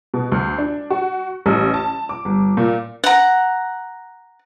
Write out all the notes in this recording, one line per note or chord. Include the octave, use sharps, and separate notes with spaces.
B2
D2
D4
F#4
A1
A5
D6
G1
A#2
F#5 A#5